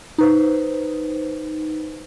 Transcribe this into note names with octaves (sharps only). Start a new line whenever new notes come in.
D#4 B4 C5